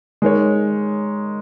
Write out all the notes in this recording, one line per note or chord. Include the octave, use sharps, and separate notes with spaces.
G#3 D#4 A#4 C#5